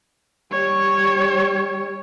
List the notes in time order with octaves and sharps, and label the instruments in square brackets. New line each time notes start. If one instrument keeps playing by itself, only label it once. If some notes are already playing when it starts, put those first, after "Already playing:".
[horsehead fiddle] G3 C#5